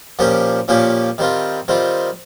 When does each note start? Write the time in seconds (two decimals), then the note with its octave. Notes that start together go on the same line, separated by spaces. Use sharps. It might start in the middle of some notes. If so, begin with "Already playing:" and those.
0.19 A#2 F3 A#3 C#4 G4
0.68 A#2 F3 A#3 C#4 G4
1.18 D#3 G3 C4 F4
1.68 D#3 G3 C4 F4